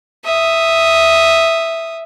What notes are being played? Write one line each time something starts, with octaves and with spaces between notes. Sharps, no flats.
E5 D#6